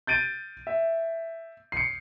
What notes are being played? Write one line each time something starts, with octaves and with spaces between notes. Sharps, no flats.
G6 A6 D7 D#7
E5
C7 C#7